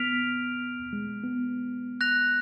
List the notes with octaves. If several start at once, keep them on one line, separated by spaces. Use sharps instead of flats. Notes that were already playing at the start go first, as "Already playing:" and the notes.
Already playing: B3 F6 B6 D7 F7
G#3
B3
F#6 A#6 F7